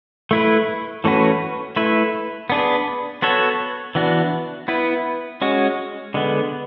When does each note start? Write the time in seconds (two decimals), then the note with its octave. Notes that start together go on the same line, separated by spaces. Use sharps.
0.31 A3 E4 B4
1.04 E3 A3 C#4 F#4 B4
1.76 A3 E4 B4
2.50 B3 D4 G#4 B4
3.22 B3 F#4 A4 C#5
3.95 E3 B3 D4 F#4
4.68 B3 E4 B4
5.42 G#3 C#4 F#4
6.14 D3 G#3 B3